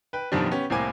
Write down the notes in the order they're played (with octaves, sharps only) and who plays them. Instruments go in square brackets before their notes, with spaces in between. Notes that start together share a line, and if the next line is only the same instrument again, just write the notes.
[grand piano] B4 G5
F#2 B2 D#3 F3 G3 D4
B3 C#4 G4
C2 A2 A#3 C4 G#5 D6